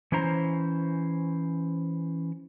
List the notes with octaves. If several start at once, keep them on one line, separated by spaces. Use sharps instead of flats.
E3 C#4 E4 C5 A#5